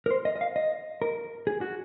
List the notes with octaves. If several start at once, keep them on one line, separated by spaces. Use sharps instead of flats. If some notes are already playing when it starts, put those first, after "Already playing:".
A#4
C5
D#5
D#5
F5
D#5
A#4
G#4
F#4